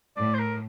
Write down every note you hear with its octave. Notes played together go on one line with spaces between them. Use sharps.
A2 D5
C5
A#4